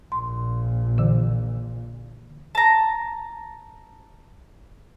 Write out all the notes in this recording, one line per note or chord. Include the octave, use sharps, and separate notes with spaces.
A#1 A#2 C6
D3 E3
A5 A#5